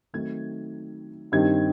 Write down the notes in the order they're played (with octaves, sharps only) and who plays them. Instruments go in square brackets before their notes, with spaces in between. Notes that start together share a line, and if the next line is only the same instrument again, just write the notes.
[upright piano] D#3 F#3 A3 C4 D#4 G#6
G2 D#3 G3 C4 D#4 G#6